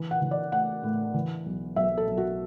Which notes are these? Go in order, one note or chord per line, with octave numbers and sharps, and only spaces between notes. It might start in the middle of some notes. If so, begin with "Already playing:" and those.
Already playing: E3
F#5
E3
D5
A3 F#5
A2
E3
B1
B1 E5
A4
B1
F#4